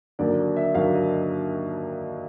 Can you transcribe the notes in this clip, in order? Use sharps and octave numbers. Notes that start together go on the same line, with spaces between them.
D#2 D3 F#3 A#3 D5
E5
D#2 D3 F#3 A#3 F5
D#5